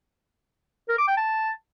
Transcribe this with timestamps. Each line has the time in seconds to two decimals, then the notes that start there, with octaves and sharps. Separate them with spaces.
0.89 A#4
0.98 D6
1.08 G5
1.17 A5